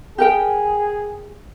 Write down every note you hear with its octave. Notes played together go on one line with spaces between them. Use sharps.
G4 G#4 A#4 G5